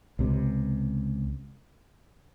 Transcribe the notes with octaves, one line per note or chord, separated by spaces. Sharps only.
C#2 C3